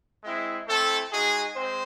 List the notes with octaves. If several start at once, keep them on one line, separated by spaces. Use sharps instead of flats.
G#3 C4 E4
A3 C4 E4 A4
G#3 D#4 F#4 G#4
G#3 C4 C5